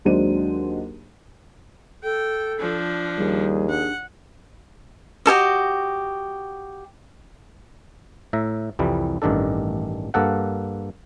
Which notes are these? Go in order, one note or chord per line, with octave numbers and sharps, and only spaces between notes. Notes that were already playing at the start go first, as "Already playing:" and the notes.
D#2 F#3 G#3 D4 C5 D#7
A4 G5
F3 D4
D#2 G3 G#4
D4 F#5
F#4 G4 A4 D#5
A2 E5 A#5
C2 F2 E3 G3
A1 G2 D#3 D4 A4
G2 A#3 A4 F#5